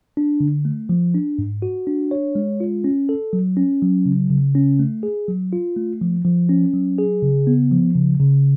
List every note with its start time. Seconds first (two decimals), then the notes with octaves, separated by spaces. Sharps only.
0.17 D4
0.40 D3
0.65 A3
0.89 F3
1.14 D4
1.39 G#2
1.62 F#4
1.87 D4
2.11 C#5
2.35 G#3
2.60 F4
2.84 C#4
3.09 A4
3.33 F#3
3.57 C#4
3.82 F#3
4.06 C#3
4.30 C#3
4.55 C#4
4.79 A3
5.03 G#4
5.28 F#3
5.53 F4
5.76 A3
6.01 F3
6.25 F3
6.49 C#4
6.74 F#3
6.98 G#4
7.22 C#3
7.47 B3
7.71 F3
7.95 C#3
8.20 C#3